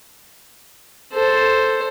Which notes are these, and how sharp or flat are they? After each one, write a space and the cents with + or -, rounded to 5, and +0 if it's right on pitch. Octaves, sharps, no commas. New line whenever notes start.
A4 +0 C5 +0